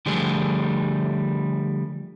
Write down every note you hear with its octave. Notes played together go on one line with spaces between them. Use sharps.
D3 F3 G3 A3 G#4